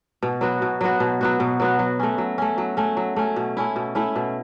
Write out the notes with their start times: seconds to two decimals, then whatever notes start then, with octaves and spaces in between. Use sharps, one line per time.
0.23 B2
0.41 F#3 B3 F#4
0.62 B2
0.81 F#3 B3 F#4
1.00 B2
1.21 F#3 B3 F#4
1.40 B2
1.60 F#3 B3 F#4
1.79 F#3
1.99 A3 C#4
2.18 F#3
2.38 A3 C#4
2.58 F#3
2.77 A3 C#4
2.97 F#3
3.16 A3 C#4
3.36 B2
3.57 A3 C#4 E4
3.76 B2
3.95 A3 C#4 E4
4.16 B2